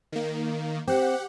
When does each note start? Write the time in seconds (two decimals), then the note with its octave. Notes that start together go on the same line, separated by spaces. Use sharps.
0.12 D#3 A#3
0.87 C4 G4 F#5